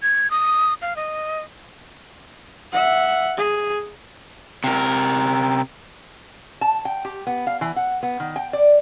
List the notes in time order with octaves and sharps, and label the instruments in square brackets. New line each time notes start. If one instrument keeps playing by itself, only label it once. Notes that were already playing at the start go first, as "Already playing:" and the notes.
[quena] G#6
D#6
F5
D#5
[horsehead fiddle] E5 F#5
G#4
[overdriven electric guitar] C3 A#4
[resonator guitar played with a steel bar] A5
G5
G4
B3
F5
E3
F#5
B3
D#3
G5
D5